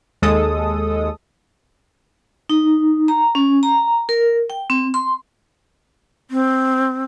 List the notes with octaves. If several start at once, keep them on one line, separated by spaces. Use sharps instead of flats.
D#2 G#3 A4 D#6
D#4
A#5
C#4
A#5
A#4
G5
C4
C6
C4